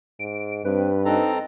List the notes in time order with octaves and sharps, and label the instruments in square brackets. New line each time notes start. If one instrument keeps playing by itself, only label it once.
[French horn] G#2 [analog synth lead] D7
[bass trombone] G2 [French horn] C4 [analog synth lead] B4
[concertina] C4 A4 A#5 [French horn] D#4